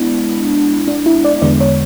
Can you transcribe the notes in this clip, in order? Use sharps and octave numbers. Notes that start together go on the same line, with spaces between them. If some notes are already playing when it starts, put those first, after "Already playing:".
Already playing: G#3 B3 D4 E4
D4
E4
D5
E2 D3 G#3 B3 D5
C#5